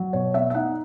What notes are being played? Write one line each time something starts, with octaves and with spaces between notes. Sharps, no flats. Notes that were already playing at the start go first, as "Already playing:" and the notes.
Already playing: F#3
B2 C#5
B3 E5
E5
D#4 F#5